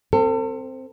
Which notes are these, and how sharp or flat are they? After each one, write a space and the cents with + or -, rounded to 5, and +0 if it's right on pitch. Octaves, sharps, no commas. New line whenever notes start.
C4 +0 A4 +35